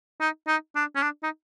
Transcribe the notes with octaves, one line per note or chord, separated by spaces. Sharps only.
D#4
D#4
D4
C#4
D4
D#4